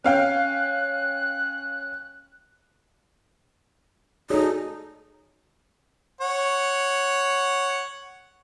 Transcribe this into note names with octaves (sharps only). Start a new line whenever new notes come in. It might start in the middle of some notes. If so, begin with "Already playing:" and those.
C#4 F5 G5 F#6
D#4 F#4 G#4 A4 C#5 D5
C#5 F#5